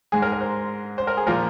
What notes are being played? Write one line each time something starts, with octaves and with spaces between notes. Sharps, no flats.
G#2 G#3 G#4
A#4
A#4
C5
C5
A#4
G#4
A#2 F3 G#3 A#4